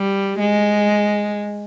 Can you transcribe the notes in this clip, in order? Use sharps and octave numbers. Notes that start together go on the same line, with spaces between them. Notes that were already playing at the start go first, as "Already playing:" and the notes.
Already playing: G3
G#3